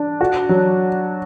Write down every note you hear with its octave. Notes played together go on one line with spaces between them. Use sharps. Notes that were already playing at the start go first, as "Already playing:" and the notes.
Already playing: D4
F#4
F#3